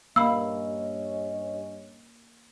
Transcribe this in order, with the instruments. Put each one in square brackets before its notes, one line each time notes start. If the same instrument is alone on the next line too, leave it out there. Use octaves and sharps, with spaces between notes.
[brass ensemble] G2 C#4 D#5 [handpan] A#3 [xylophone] F5 B5 [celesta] E6